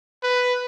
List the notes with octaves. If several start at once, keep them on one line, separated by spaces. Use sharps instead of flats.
B4